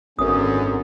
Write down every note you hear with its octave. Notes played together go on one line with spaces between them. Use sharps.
G#1 F#2 D3 B3 C#4 D#6